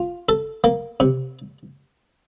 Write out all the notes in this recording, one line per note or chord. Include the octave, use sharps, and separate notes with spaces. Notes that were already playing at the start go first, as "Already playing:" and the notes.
Already playing: F4
A4
A#3
C3